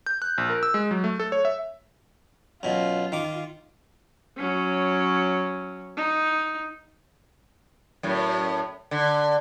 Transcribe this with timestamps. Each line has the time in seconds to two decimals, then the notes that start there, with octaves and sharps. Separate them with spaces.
0.06 G6
0.22 F#6
0.38 A#1
0.50 A#4
0.63 E6
0.74 G#3
0.91 F#3
1.04 A3
1.20 A4
1.32 C#5
1.45 E5
2.63 F#2 B2 F4
3.12 D#3 D6
4.37 F#3 C#4
5.97 D#4
8.03 F#2 A2
8.91 D3